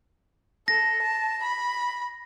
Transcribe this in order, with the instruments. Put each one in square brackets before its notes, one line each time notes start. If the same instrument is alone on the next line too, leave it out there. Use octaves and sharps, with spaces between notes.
[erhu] A4 [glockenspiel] A#6
[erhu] A5
B5